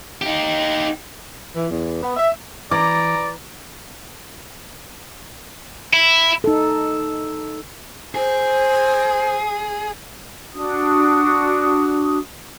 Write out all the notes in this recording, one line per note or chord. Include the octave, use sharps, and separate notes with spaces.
D#4 G4
E3
E2
B3
E5
E3 D5 A#5 D6
E4
D#4 A4
G#4 C5
D4 F#4 D#6